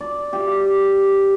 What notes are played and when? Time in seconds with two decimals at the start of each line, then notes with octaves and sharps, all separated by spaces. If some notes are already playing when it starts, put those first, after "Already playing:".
0.01 D5
0.33 G4